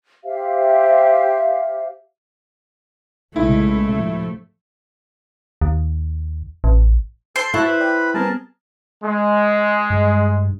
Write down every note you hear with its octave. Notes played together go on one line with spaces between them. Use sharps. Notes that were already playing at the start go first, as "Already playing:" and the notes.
G4 C5 E5 F5
B1 A#2 C#3 G#3 A3 E4
D2 A2 C3 F3
D#2
A1
A4 C5 C6
E4 F#4 A4 E5 F#6
B4 B5
D5 G5
G3 B3 C4 G#4 A#4 A5
G#3
G2